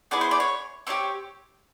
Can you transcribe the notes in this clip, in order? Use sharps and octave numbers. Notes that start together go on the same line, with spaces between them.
B3 E4 G#4 D5
C5
D5
C#5
C4 D#4 G4 C#5